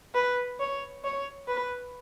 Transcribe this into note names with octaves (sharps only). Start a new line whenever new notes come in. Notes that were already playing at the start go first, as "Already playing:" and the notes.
B4
C#5
C#5
B4